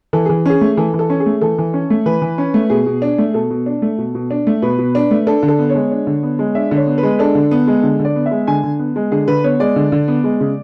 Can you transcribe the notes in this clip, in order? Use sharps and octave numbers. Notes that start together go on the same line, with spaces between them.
E3 A4
E3 G#4
C#4 G#4
A3
E3 A4
E3
A4
C#4
G#4
A3
E3 A4
E3
C#4
A3
E3 B4
E3
C#4
A3
B2 G#4
B2
D4
A3
B2 A4
B2
D4
A3
B2
B2
D4
A3
B2 B4
B2
D4
A3
D4 A4
D3
A4
B3
C#5
G#3
D4
D3
B3
G#3
D4 E5
D3
C#5
B3
B4
G#3
D4 A4
D3
B3
G#3
D3
D3
D5
B3
E5
G#3
D3 G#5
D3
B3
G#3
D3 G#4
D3 B4
B3 C#5
G#3 D5
D3
D3
B3
G#3
C#3